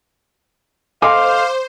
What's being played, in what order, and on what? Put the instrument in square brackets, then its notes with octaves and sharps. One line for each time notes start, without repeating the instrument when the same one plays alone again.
[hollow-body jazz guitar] A4 D#5 G#5 [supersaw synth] C5 [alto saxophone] F5 [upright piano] C6 D6